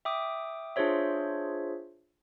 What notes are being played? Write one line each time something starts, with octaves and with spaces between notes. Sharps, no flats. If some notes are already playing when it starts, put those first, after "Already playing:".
E5 G5 D6 D#6
D4 F4 G#4 C5 C#5 E5